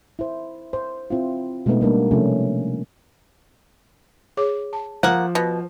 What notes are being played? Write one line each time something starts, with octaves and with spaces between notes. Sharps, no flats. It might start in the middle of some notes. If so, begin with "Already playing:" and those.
E4 C5
C5
C4 E4 F4
B2 G#3 A3 B3 D#4
G3 A#3 D4
C3 F3 A3 C#4
G#4 C#5 D6
A5
F3 A#3 F#5
B2